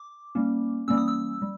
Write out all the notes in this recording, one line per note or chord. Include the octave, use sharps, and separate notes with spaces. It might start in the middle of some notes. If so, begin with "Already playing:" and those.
Already playing: D6
G3 A#3 C#4
E3 G3 A#3 C#4 E6
D#6
E6
G3